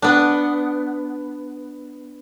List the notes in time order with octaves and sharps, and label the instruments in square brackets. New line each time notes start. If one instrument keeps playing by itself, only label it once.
[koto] B3 D4